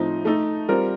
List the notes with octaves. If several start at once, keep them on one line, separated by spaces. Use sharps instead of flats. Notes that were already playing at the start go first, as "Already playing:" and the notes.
Already playing: A2 F3 C4 D#4
A3 D#4 A4
G3 C4 F4 A#4